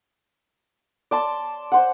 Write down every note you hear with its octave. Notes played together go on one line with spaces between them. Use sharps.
D5 A5 C6
C5 F#5